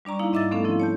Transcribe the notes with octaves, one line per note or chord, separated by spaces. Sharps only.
G3 D4 D5 A#5 C#6
A#3 D#4 E4 F5
G#2 D#5 E5 D6 E6 A6
A3 B3 C#4 D4 A4 F5
F3 C4 E4
C#5 A5 G6